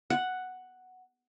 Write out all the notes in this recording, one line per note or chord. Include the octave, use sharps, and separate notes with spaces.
F#5